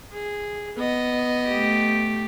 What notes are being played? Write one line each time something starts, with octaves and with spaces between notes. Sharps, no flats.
G#4
B3 D#5
A3 G4